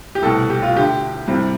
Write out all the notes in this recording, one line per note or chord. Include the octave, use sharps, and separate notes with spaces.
G4
C2 B2 A3 A4
G4
F4
D2 D3 A3 G4
C2 C3 G3